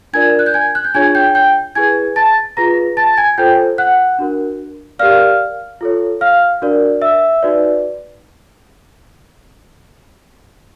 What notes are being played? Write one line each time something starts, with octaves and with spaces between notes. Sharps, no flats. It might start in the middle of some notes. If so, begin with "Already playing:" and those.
D4 F4 A#4 D5 G#5 G#6
F#6
G6
G#5 G#6
F#6
G6
D4 F4 G#4 C#5 G#5 G#6
G5 G6
G5 G6
E4 G#4 B4 G#5 G#6
A5 A6
F4 G#4 B4 A#5 A#6
A5 A6
G#5 G#6
F4 A4 C5 G5 G6
F#5 F#6
D4 F#4 A#4
G4 A#4 D5 F5 F6
F4 A4 C#5
F5 F6
D4 F#4 A#4 D5
E5 E6
D#4 F#4 B4 D5